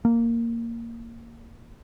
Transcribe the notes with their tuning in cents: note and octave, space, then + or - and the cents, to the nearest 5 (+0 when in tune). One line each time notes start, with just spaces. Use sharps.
A#3 -10